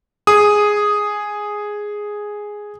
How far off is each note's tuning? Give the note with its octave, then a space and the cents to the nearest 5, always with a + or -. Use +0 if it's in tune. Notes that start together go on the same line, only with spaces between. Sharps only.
G#4 +0 D#6 +0